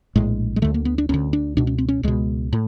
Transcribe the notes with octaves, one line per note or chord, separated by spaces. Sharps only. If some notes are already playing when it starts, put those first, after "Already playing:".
A#1 A2 G#3
G#3
D2 D3 A3
A#3
B3
D4
D2 D3 C#4
D4
C#2 B2 D4
C#4
C4
C#4
C#2 B2 G#3
A2